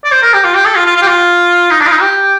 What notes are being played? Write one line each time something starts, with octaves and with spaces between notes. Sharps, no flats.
D5
C5
A#4
G4
F4
G4
A4
F4
F4
F4
G4
F4
D#4
D4
F4
D#4
G4